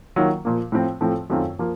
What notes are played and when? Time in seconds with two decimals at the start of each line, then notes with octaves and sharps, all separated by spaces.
0.16 D#3 F#3 A#3 F4
0.45 A#2 F3 A#3
0.72 A2 F3 C4
1.01 A2 F3 A3 C4
1.29 F#2 D#3 A3 C4 F4
1.59 F3 A#3 F4